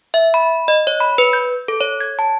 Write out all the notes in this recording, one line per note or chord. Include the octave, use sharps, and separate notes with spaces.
E5
B5
D#5
C#5
B5
B4
G6
A4
C#5
G#6
A5